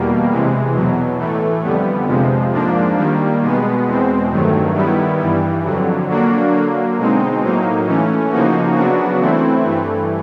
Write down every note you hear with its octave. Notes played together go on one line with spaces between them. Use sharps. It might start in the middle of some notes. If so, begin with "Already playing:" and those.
Already playing: E2 B2 G3 A#3
C3 E3 G#3
E2 B2 F#3
A2 E3 A3
F2 D3 G3 B3
F2 C3 F3 G#3
G#2 F3 A#3 D4
D#3 G3 A#3
B2 G#3 B3
E2 B2 G#3 C4
G2 D#3 F#3 A3
D#3 G3 B3 E4
G2 E3 G3
F2 D3 F#3
D3 F#3 A#3 D4 F#4
D3 F#3 A#3
B2 G#3 C4 D#4
A2 F#3 A#3 D#4
E3 A3 C#4
C#3 F3 A#3 D#4 F#4
C#3 F#3 B3 D4 F#4
E3 A3 C4 E4
G2 E3 A3